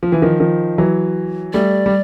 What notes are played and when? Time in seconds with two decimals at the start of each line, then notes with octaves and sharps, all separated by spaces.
0.03 F3
0.12 E3
0.22 D#3 F3
0.40 D#3 F3
0.78 E3 F#3
1.53 G3 A3 D5
1.86 G3